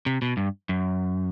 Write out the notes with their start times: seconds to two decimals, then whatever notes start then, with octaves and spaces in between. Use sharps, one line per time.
0.06 C3
0.22 B2
0.37 G2
0.69 F#2